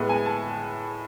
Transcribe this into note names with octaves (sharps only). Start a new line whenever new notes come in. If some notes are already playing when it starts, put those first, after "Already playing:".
Already playing: A2 G#3 B3
G#5
A5